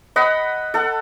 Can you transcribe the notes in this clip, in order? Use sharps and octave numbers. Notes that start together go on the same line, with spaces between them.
D#5 F#5 B5
A4 F#5